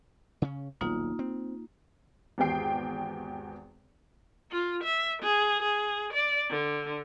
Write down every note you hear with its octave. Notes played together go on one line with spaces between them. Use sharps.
C#3 C#4
D#1 B1 A#3 D#4 F4
C4
G#1 E2 B3 G4 G5 C7
F4
E5
G#4
G#4
D5
D3